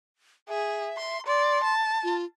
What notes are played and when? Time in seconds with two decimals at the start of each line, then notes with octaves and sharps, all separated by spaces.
0.49 G#4 E5
0.97 C6
1.26 D5 C6
1.63 A5
2.03 F4